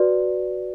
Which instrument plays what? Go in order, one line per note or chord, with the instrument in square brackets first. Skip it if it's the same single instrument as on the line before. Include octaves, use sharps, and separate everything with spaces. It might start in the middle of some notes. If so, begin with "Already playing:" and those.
Already playing: [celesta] F#4 B4 D5